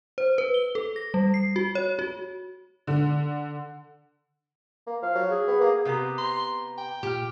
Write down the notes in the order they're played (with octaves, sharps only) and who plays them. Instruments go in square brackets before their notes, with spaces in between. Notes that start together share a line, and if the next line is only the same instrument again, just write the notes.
[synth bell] C5
B4
G7
A4
A#6
G3
C7
F#4
C#5
F#4
[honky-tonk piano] D3
[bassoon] A#3
[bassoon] F3 [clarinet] F5
[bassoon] F#3
[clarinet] G#4
[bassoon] B3
A#3
[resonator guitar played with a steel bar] C3 B3 G4 [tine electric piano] A#5 D#6
[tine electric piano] A#5 [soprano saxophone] C6
[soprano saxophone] G5
[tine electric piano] A#2 F6 [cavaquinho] G4